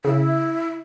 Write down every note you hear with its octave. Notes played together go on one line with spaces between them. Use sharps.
C#3 E4